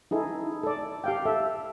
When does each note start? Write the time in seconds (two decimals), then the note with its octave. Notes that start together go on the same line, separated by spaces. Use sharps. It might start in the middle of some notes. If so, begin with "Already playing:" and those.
0.11 D#4 E4 G#4 A4
0.63 A4 D5
1.04 G4 F5 G5
1.25 A4 E5